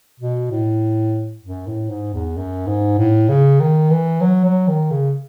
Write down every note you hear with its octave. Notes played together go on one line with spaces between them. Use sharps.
B2
A2
F#2
A2
G#2
E2
F#2
G#2
A2
C#3
D#3
E3
F#3
F#3
D#3
C#3